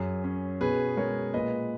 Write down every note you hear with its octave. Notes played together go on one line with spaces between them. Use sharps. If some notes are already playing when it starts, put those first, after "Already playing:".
Already playing: F#2 G#4
C#4
B2 G#4 B4
G#3 A#4 C#5
A#2 B4 D#5